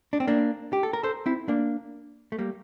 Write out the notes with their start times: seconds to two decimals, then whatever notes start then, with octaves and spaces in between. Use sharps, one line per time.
0.13 D4
0.20 C4
0.28 A#3 D4
0.73 G4
0.83 A4
0.93 A#4
1.03 A4 C5
1.26 C4 E4
1.48 A#3 D4
2.32 A3
2.39 G3 A#3